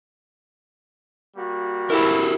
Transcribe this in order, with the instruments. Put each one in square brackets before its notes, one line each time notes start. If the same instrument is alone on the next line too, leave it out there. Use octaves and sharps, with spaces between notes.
[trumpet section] G3 A#3 F#4
[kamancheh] E4 B5 [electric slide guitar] G4 A4 A#4